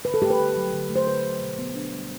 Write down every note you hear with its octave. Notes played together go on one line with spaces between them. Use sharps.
D3 B4
A4
A3 G4
B4
D3
F#3
D3
A3
C5
D3 B4
F#3
B2
B3
D4
G3